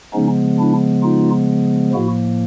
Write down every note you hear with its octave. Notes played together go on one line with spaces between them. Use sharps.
C#3 F3 G#3 B3 C#4 D#4
D4 E4
D#4 F4
A2 F3 A#3 E4 F#4